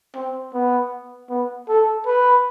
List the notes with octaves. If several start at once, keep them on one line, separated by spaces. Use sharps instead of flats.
C4
B3
B3
A4
B4